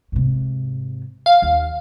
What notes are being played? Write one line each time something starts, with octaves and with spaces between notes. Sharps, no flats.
G#2 C3
F5
D#2